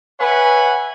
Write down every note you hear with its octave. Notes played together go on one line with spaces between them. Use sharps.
B4 C#5 E5 F#5 G#5 B5